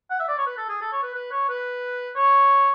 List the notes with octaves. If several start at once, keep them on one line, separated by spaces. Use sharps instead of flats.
F#5
E5
D5
C#5
B4
A4
G#4
A4
C#5
B4
B4
C#5
B4
C#5